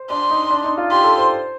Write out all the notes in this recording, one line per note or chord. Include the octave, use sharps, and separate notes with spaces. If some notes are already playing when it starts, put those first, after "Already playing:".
Already playing: C5
D4 C6
D#4
D4
D#4
F4
G4 C6
A4
C5